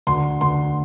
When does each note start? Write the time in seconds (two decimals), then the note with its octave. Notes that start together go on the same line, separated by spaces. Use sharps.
0.07 D2 C6
0.41 D2 C6